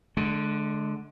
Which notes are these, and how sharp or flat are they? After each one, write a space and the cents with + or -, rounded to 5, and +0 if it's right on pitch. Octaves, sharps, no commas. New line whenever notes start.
D3 +5 G#3 +35